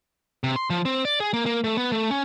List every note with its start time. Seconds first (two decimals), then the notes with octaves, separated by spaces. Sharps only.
0.44 C3
0.56 C6
0.70 F3
0.85 C4
1.05 D5
1.20 G#4
1.33 A#3
1.46 A#3
1.64 A3
1.77 B3
1.92 A3
2.11 C#4